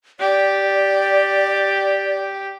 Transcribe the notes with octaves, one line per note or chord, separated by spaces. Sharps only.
G4 D5